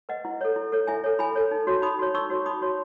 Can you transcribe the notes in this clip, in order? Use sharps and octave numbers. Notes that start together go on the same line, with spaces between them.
B4 D#5 F#5
E4
A4 C#5
E4
A4 C#5
E4 E5 G#5
A4 C#5
E4 G#5 B5
A4 C#5
D#4
F#4 C#5
D#4 B5 D#6
F#4 C#5
D#4 C#6 E6
F#4 C#5
D#4 B5 D#6
F#4 C#5